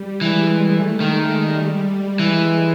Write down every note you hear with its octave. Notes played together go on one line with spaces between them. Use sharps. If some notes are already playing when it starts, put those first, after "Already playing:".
Already playing: G3
E3 G#3
A3
D#3 G#3
G3
G3
E3 G#3